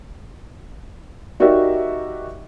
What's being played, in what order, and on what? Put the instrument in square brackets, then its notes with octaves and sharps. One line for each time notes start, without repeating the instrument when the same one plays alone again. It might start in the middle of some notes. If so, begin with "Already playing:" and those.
[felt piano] D#4 F#4 G4 A#4 D5 E5